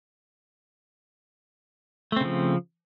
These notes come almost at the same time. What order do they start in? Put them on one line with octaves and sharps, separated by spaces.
A3 C4 C#3 F3